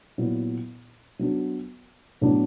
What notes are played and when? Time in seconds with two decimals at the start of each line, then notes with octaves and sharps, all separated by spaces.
0.18 A#2 F#3 B3 E4
1.19 F#3 B3 D4 F#4
2.21 A2 F#3 B3 D4